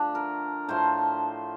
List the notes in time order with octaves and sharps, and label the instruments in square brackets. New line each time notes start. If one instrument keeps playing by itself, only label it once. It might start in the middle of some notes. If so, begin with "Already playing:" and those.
Already playing: [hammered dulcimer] D3 F3 A3 D4
A#4
A2 F3 A3 C5